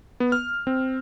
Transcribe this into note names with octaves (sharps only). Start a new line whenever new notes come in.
B3
F6
C4